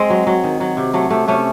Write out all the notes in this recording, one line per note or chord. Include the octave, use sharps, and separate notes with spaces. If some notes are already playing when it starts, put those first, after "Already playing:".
Already playing: G#3 C4
F#3
F#3
D#3
F#3
C3
F#3 A3
C3 A3
C3 A3 C#4